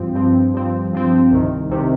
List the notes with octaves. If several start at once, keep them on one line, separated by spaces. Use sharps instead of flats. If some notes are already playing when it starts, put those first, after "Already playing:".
Already playing: G2 F3 C4
G2 F3 C4
G2 F3 C4
G2 F3 C4
C2 C3 D#3
C2 C3 D#3